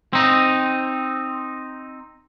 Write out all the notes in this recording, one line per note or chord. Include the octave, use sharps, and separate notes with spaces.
C4 D#4